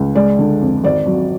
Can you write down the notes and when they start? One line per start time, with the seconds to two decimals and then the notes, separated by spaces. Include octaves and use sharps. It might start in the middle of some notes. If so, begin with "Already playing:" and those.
Already playing: C#2
0.15 G#3 D5
0.39 D3
0.61 F2
0.83 G#1 D5
1.06 F#3